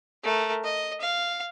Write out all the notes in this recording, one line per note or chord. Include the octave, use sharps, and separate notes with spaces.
A3 A#4
D#5
F5